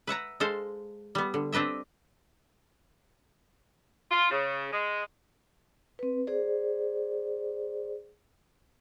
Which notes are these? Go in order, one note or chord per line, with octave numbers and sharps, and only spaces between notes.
B4 E5 F#5 A#5
G#3 A4 C5 F5
G3 B3
D3
C4 D4 B4 D#5 E5
F4
C#3
G#3
C4 B4
G#4 C5 D5